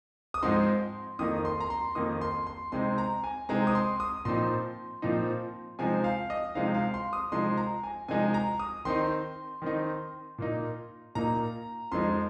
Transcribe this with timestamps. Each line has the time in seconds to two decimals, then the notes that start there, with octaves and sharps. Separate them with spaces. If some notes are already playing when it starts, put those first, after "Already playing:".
0.34 D#6
0.43 G#2 F3 G#3 C4 D#4 C6
1.19 F2 D#3 A#3 D#4 D#6
1.45 C6
1.60 A#5
1.70 C6
1.95 F2 D#3 A#3 D#4 D#6
2.21 C6
2.47 C6
2.72 C3 G#3 C4 D#4 C6
2.98 A#5
3.24 G#5
3.49 C3 G#3 C4 D#4 A#5
3.67 D#6
3.75 C6
4.00 D#6
4.25 A#2 F3 C4 D#4 C6
5.02 A#2 F3 C4 D#4
5.79 C3 F3 G#3 C4 D#4 G#5
6.04 F5
6.30 D#5
6.55 C3 F3 G#3 C4 D#4 F5
6.74 F5
6.94 C6
7.13 D#6
7.32 C3 F3 G#3 D#4 C6
7.57 A#5
7.84 G#5
8.08 C3 F3 G#3 D#4 G#5
8.34 A#5
8.59 D#6
8.85 D#3 C4 D#4 C6
9.62 D#3 C4 D#4
10.38 A#2 A#3 D#4
11.15 A#2 A#3 D#4 A#5
11.92 F2 F3 G#3 D#4 C6